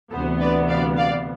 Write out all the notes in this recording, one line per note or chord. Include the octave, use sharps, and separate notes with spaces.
D2 C3 E3 B3 A4 C5
B4 D5
D5 F5
D5 F5